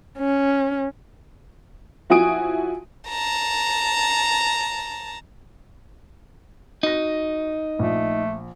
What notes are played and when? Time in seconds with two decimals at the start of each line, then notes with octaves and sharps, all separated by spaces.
0.18 C#4
2.10 F3 E4 F#4 G#5 D#6 D7
3.09 A5 A#5
6.83 D#4 F#4 A#6
7.79 A#1 A3